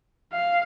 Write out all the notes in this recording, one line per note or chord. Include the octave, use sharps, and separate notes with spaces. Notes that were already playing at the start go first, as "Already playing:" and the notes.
F5